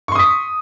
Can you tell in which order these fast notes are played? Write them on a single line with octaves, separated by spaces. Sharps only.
C#6 C6 D#6 B6